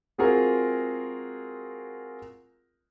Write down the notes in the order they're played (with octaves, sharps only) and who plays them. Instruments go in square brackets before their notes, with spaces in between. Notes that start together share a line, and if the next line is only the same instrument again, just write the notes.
[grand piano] G#3 C4 F4 F#4 G#4 A#4